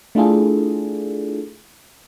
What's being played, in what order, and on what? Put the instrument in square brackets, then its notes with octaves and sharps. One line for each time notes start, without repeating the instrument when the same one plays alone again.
[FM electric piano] A3 D4 E4 F4 G#4 A4